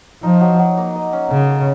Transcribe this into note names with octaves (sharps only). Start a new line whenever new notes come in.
F3 D#4
F#3
F#3
A#3
D#5
C#4
C#3 C#4
A4